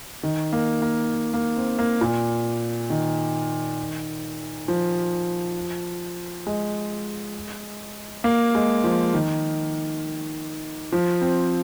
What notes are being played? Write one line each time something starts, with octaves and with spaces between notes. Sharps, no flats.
D#3
A#3
A#3
A#3
C4
A#3
A#2
D#3
F3
G#3
A#3
G#3
F3
D#3
F3
C4